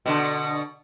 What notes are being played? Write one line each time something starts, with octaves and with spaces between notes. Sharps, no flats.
B2 D3